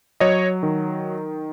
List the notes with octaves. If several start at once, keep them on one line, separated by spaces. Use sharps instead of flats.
F#3 C#5 D#5
D#3